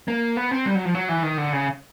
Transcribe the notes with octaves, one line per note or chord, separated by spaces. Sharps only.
A#3
B3
C4
G3
F#3
F3
F#3
E3
D#3
D3
C#3